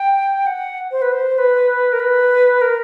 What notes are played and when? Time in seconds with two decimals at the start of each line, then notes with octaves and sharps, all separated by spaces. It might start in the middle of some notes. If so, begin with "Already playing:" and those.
Already playing: G5
0.46 F#5
0.91 C5
1.02 B4
1.12 C5
1.38 B4
1.93 A#4
2.00 B4
2.61 A#4